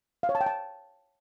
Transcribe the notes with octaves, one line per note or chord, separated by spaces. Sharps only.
F5
C#5
A5
G5
A5